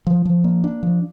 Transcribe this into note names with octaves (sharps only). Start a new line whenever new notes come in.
F3
F3
A#3
D4
F3